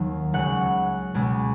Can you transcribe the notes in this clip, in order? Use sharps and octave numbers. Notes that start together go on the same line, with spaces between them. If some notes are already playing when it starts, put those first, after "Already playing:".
Already playing: D#2 D#3 F#3
C#2 C#3 F#3 F#5
C#2 B2 G#3